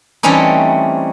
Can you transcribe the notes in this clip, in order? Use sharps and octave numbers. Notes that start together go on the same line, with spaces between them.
E3 G3 A3 C4 C#4 D#4